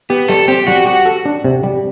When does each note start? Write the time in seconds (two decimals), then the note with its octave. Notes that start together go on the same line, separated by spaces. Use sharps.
0.10 B3 G4
0.28 G3 A4
0.48 C4 G4
0.67 G3 F#4
0.86 F#4 G4
1.06 A4
1.25 D4
1.44 C3
1.63 G3